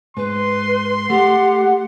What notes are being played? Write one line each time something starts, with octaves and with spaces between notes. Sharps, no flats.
G#2 B4 C6
A3 G4 F#5